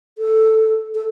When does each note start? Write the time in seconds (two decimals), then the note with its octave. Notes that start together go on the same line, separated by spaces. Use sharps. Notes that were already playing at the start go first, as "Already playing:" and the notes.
0.18 A4
0.95 A4